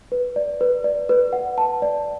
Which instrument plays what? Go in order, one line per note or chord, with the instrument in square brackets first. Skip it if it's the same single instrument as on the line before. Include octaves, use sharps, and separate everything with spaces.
[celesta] B4
D5
B4
D5
B4
F#5
A5
D5